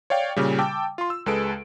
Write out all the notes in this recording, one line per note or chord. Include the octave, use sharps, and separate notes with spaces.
C#5 D5 F5 G5
A#2 C#3 G3
G5 A5 D6 E6
F4 C6
E6
C#2 G#3 A4 B4 D7